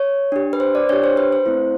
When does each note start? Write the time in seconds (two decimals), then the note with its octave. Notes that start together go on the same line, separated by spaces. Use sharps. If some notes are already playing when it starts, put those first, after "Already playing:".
Already playing: C#5
0.32 D4 G4
0.53 B4
0.60 C5
0.75 D5
0.89 D4 G4 C#5
1.04 C5
1.17 B4
1.33 C5
1.46 A3 C4 E4